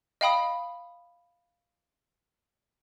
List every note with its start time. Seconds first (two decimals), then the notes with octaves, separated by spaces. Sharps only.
0.21 D#5 F5 G5 B5 D#6